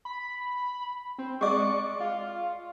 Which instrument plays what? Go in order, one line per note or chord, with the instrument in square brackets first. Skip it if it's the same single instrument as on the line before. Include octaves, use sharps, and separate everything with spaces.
[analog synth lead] B5
C4
[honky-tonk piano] G#3 D5 [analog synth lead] C#6
[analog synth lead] F4